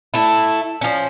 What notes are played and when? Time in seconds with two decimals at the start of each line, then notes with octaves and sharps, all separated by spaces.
0.14 A3 E4
0.81 F3 C#4